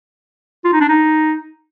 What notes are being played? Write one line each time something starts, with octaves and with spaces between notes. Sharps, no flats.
F4
D#4
D4
D#4